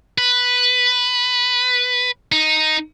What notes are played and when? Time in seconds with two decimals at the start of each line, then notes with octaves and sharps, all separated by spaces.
0.18 B4
2.32 D#4